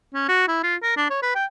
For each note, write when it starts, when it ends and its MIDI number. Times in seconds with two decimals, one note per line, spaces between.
0.14 0.25 61
0.28 0.46 66
0.48 0.59 64
0.63 0.75 65
0.83 0.96 70
0.97 1.05 62
1.10 1.18 73
1.22 1.32 71
1.35 1.45 79